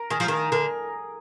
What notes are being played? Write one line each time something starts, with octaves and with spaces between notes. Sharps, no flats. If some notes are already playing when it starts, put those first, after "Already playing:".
Already playing: A#4
D#3 G#4
F3
D#3 A#4
D3 A#4